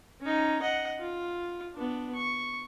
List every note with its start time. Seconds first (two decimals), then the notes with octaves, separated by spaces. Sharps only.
0.22 C#4 D#4
0.62 D#5 F#5
1.00 F4
1.74 B3 D4
2.15 C#6